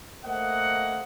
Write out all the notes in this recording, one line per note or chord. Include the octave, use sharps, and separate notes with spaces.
A3 A#3 C5 D#5 F#5